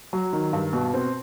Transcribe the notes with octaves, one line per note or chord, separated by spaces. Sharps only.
F#3
D#3
G2
B2
C4